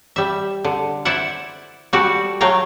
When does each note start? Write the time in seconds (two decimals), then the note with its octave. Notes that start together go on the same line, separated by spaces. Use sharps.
0.16 G3 E5
0.65 D3
1.05 E4 C5 D5 E5 F#5
1.93 G3 F#4 A4 D5
2.41 F#3 A3 F5 G5 A#5